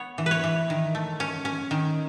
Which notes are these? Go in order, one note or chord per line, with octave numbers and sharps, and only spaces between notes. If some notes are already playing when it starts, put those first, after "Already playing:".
Already playing: B3 C#5
E3
B4 C#5
E3
D#3
A3
C#4
C#4
D#3